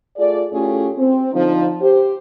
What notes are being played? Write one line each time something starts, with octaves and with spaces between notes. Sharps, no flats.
A3 F4 G#4 D5
A2 A3 C#4 F4 G4 G#4
C4
D3 F3 D#4
G4 C5